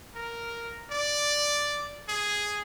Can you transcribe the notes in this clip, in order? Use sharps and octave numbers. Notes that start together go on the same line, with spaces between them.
A#4
D5
G#4